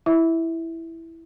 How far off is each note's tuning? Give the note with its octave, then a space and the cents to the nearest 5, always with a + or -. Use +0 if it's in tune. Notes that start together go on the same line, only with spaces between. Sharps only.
E4 +0 E5 -15